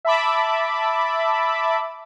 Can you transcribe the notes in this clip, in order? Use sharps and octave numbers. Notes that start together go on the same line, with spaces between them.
E5 A5 B5 D6